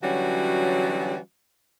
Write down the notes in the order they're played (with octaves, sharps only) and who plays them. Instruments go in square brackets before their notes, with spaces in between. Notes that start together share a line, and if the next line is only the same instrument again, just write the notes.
[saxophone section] D3 E3 F#3 G3 C#4 F#4